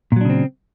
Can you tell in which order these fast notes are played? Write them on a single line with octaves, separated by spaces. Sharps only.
A#2 F#3 D4 C#3 C4